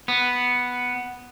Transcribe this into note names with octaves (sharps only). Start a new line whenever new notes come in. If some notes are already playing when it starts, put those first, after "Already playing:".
B3